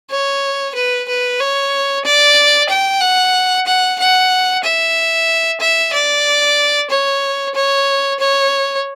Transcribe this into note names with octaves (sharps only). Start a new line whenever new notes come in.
C#5
B4
B4
C#5
D5
G5
F#5
F#5
F#5
E5
E5
D5
C#5
C#5
C#5